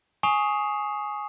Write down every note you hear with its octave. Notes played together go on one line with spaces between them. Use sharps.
G#5 C#6 D#6 C7 E7 F7